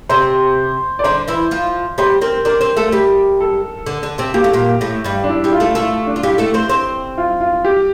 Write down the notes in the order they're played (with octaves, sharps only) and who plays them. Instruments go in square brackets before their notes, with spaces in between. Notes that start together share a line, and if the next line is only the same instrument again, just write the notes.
[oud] C3 C4 [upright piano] C5
[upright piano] D5
[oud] D3 D4 [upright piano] C5
[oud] E3 E4
F3 F4
[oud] G3 G4 [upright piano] C5
[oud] C4 C5 [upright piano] A#4
[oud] D4 D5 [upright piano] A#4
[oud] C4 C5
A3 A4
G3 G4
[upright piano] A4
[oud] D3 D4
D3 D4
C3 C4
[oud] A#3 [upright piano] G4
[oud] A3
A#2 A#3
A2 A3
G2 G3
[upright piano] D4
E4
[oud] G3 G4
[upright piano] F4
[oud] A3 A4
[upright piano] E4
[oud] A3 A4 [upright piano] F4
[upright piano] D4
[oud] F4
[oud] G3 G4 [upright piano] E4
[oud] A3 A4
C4 C5
C4 C5
[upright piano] F4
F4
G4